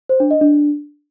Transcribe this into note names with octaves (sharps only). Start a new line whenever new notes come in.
C5
D4
D#5
D4